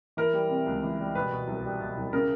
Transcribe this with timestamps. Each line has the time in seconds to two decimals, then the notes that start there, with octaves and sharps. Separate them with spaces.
0.17 E3 A#4
0.33 G3
0.49 C3
0.66 C#2
0.83 E3
0.99 G3
1.15 B2 B4
1.32 B2
1.47 C2
1.64 G3
1.81 B2
1.97 C2
2.13 C#3 A#4